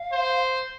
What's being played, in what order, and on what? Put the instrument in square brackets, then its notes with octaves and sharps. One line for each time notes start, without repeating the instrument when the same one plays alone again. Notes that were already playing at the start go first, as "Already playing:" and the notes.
Already playing: [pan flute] F5
[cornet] C5